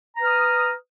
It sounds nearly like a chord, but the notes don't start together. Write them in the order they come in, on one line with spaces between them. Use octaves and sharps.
A#5 B4 F6 D#6